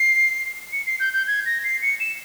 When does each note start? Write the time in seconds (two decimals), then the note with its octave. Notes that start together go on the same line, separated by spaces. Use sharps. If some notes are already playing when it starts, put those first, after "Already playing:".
Already playing: C7
0.73 C#7
0.86 C7
1.00 G6
1.13 G6
1.27 G#6
1.46 A#6
1.64 C7
1.82 C#7
2.00 E7